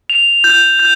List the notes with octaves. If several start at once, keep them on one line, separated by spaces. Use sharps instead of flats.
F7
G6
G6